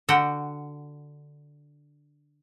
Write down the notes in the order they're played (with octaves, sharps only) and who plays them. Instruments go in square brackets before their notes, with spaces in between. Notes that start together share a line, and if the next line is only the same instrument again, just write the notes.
[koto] D3 F#4 F#5 G5